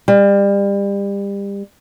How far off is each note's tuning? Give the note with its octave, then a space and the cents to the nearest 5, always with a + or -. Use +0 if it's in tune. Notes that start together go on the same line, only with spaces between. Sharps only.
G3 +30